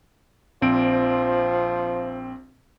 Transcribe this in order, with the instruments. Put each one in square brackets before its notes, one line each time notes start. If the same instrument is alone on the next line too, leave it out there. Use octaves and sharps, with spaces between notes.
[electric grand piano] A#1 C4 D7 [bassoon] F3